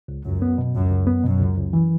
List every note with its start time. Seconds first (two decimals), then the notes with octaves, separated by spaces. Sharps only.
0.08 C#2
0.25 C#2 F#2
0.42 B3
0.58 B2
0.74 C#2 F#2
0.91 C#2
1.07 B3
1.23 F#2 B2
1.41 C#2
1.57 C#2
1.73 E3